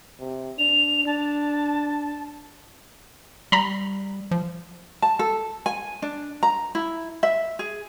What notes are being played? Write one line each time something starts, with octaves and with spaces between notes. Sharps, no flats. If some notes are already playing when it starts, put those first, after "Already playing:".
C3
D4 F7
D4 A5
G3 A#5 B5
F3
A5
A4
G#5
D4
A#5
E4
E5
G#4